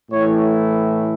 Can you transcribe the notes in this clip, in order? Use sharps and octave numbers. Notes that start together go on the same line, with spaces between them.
A2 E3 A3 E4 C#5